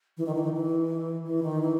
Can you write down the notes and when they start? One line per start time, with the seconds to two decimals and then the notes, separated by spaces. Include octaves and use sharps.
0.17 E3
0.26 D#3
0.35 E3
0.43 D#3
0.53 E3
1.24 E3
1.43 D#3
1.61 E3